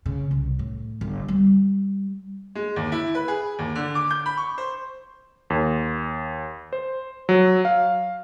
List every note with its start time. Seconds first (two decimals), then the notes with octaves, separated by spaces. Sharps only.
0.06 C#3
0.31 C2
0.59 A2
1.01 G1
1.28 G3
2.55 G#3
2.76 D#2
2.92 E4
3.15 B4
3.28 G#4
3.59 D#2
3.75 D3
3.95 D6
4.11 G6
4.26 B5
4.37 C#6
4.58 C5
5.50 D#2
6.73 C5
7.29 F#3
7.65 F5